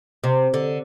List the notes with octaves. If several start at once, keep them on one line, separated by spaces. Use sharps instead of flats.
C3
D3